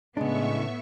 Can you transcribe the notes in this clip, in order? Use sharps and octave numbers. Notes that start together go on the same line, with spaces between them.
A2 C#3 G#3 B3 D4 E5 C#6